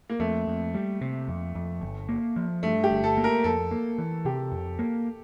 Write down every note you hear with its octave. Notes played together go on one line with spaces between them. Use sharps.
A#3
F2 A3
F2
G3
C3
F2
F2
G1
A#3
F3
G2 A3
G4
G1
A4
A#3
A#4
F2 A4
A#3
E3
C3 G4
F2
A#3